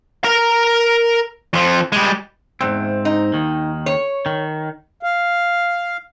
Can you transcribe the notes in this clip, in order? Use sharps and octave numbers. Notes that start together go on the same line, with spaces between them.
A#4 A#5
F2 F3
G3 G#3
E2 G#2 C4
D#4
D#2 D#3
C#5
D#3
F5